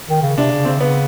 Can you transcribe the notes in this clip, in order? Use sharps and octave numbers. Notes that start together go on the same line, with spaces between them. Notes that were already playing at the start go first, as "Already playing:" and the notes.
D#3
C#3
C3 D4
C#3
C#3 C4
C#3 B3